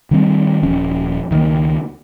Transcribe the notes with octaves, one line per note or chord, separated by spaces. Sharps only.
D#3 G3 C4
D#1 F3 C#4
C#2 D#3 G3 A#3